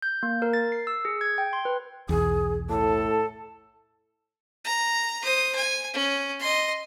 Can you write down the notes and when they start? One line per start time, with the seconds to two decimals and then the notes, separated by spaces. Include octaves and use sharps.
0.02 G6
0.23 A#3
0.42 A#4
0.53 A6
0.72 C7
0.87 E6
1.05 G#4
1.21 G#6
1.38 G5
1.53 C6
1.65 B4
2.09 B1 E2 G#4
2.69 A2 A4 A5
4.65 A#5
5.22 C5 D#6
5.55 G#5
5.94 C#4
6.40 D#5 C6